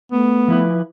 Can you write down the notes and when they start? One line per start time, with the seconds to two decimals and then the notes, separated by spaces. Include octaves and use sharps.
0.12 A3 B3
0.48 F3 E4 B4